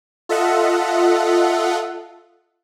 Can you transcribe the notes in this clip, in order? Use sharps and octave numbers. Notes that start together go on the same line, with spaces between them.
F4 A4 D#5 E5 F#5